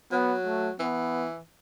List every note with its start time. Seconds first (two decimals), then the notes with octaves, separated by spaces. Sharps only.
0.12 F#3 B3
0.46 A3
0.80 E3 B3